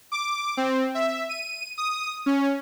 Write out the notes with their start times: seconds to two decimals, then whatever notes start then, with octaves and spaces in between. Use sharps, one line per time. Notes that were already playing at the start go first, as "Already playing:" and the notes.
0.12 D6
0.57 C4
0.95 E5
1.29 D#7
1.78 D#6
2.26 C#4